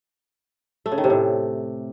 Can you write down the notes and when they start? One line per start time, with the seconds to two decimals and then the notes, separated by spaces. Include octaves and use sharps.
0.86 A3
0.92 C#3
0.98 D#3
1.04 C3
1.10 A2